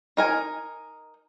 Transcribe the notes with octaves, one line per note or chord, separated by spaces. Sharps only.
D#4 A#4 G#5